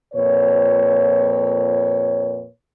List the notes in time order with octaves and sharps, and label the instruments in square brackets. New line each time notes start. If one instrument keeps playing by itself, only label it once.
[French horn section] F2 A#2 B4 C#5